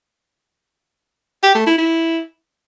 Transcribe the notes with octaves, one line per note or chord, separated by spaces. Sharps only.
G4
A3
E4
E4